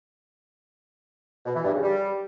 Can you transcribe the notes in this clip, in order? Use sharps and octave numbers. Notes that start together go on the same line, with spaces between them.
B2
E3
G2
C#3
G3